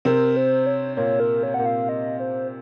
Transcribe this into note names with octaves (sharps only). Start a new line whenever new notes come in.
C3 C4 A#4
C5
C#5
A#2 A#3 C#5
A#4
C#5
A#2 A#3 F#5
F5
D#5
C5